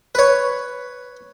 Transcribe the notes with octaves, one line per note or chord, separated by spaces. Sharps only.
B4 C#5